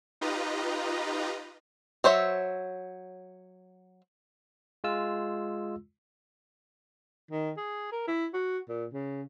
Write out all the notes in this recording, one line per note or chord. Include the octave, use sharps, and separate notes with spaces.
D#4 F4 G4 B4 D#5 A#5
F#3 C5 C#5 E5
G#3 F4 E6
D#3
G#4
A#4
E4
F#4
A#2
C#3